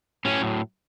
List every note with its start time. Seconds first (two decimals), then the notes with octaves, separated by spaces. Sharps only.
0.25 A2 F#3 C#4